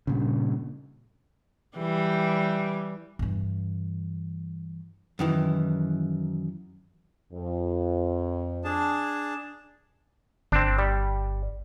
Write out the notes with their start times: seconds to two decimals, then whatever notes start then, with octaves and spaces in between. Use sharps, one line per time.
0.07 G2 A#2 C#3
1.77 E3 G3 G4
3.19 G2 E3
5.19 F#2 D#3 E3
7.33 F2
8.64 D4 G#4 A5
10.52 G1 C4 D4
10.78 G3